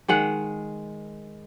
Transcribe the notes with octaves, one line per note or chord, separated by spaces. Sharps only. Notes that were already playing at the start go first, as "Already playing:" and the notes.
D#3 G#3 F#5